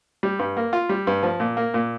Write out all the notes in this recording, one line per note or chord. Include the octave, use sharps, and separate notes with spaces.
G3
G2
A#3
F4
G3
G2
F3
A#2
A#3
A#2